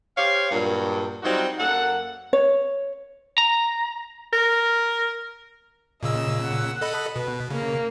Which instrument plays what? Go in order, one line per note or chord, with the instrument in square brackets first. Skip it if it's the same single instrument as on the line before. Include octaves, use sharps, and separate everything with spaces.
[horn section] G4 C5 C#5 F5
G2 A#2 F#3
F#3 G3 C4 D#4 F4 F#4
F#2 A#3 A4 F#5
[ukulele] C#5
[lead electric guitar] A#5
[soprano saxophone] A#4
[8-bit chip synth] A#2 C#3 E6 [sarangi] D#5
[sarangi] F#5
[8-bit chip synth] A4 D#5 B5
[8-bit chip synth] B2 [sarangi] B4
[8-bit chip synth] C#3 [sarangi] A#3